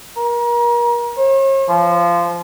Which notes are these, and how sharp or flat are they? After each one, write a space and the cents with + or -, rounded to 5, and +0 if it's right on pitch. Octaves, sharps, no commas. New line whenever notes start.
A#4 +35
C#5 -45
F3 -20